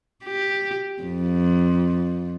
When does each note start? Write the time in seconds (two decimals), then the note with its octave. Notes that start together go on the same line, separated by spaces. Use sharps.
0.25 G4
1.02 F2